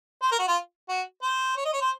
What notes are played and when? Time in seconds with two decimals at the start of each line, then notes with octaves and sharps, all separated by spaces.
0.22 C5
0.32 A#4
0.39 F#4
0.48 F4
0.89 F#4
1.22 C5
1.57 C#5
1.65 D#5
1.73 C#5
1.81 C5